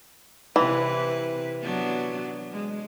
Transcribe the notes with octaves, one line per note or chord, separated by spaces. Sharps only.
C3 E3 E4 B4
F#3 B3 D4
G#3